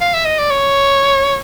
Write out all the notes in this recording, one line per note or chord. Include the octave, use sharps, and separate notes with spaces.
F5
E5
D#5
D5
C#5